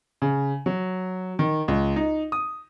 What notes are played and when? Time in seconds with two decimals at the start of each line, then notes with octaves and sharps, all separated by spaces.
0.22 C#3
0.66 F#3
1.39 D#3
1.68 C#2
1.96 D#4
2.32 D#6